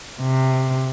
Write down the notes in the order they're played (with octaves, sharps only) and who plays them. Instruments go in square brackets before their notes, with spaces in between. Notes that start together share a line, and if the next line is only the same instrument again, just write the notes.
[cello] C3